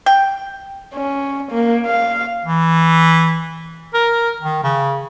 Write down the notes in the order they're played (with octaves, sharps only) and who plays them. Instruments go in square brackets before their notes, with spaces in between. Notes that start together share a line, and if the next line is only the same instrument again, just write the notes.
[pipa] G5
[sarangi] C#4
A#3
F5
[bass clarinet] E3
A#4
D#3
C#3